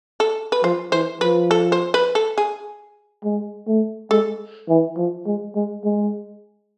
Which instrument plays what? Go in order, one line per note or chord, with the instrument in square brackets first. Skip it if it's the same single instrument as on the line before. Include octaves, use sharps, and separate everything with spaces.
[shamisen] A4
B4
[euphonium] F3 [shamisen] C5
[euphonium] E3 [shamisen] C5
[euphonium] F3 [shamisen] B4
[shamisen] A4
C5
B4
A4
G#4
[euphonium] G#3
A3
[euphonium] G#3 [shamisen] A4
[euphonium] E3
F3
G#3
G#3
G#3